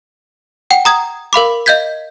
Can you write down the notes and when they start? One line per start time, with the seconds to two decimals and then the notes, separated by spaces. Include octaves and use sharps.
0.71 F#5 G5
0.85 A#5 D#6 G#6
1.33 A#4 F5 B5 D6
1.66 D#5 F5 G6 G#6 B6